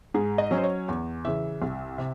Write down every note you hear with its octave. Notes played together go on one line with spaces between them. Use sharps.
G#2 G#4
D#5
F#3 C#4
C5
C#5
E2
C#3 E3 E5
C2
C3